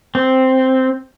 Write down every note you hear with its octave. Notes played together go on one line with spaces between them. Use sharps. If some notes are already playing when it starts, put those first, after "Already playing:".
C4